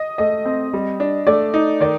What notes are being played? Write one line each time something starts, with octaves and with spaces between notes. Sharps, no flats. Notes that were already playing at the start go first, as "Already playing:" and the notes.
Already playing: D#5
A3 D#5
C4
G3
D4
A3 D5
D#4
D#3 D5